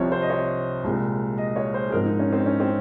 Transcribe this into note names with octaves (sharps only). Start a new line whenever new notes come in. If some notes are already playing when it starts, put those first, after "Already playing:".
Already playing: C2 C3 F3 C4 C#5
C5
D#5
C#5
C2 A#2 G#3
D#5
C#5
C5
G#4
G#2 F3 C4 A#4
D#4
C#4
C4
C#4
C4